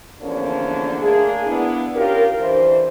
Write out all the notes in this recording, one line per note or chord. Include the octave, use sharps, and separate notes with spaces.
E2 D3 F3 A#3 C#4 D4
A3 A#3 D4 G#4
B3 D4 E4
C#4 F4 G4 A#4
E3 D4 C5